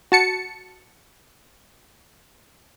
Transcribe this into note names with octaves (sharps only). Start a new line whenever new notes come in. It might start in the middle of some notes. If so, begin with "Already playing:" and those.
F#4 A5 C#7